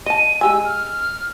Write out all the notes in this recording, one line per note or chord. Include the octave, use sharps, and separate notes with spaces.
D#5 A5 D#7
G#3 G4 G#5 E6
F6